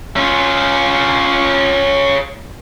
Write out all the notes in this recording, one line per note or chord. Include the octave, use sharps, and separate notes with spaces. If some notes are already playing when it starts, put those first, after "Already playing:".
C#4 F4